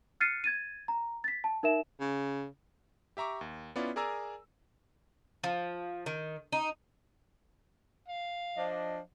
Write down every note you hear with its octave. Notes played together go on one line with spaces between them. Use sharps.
F6 F#6 A6 C7 C#7 D#7
G#6 A6 D#7
A#5
A6 B6
A5
D#4 A#4 E5 E7
C#3
G4 E5 A#5 C#6 D6
D#2
B3 C#4 E4 F4 D5
G#4 A#4 D5 G#5 A#5 E6
F3
D#3
D#4
F5
F3 D4 D#5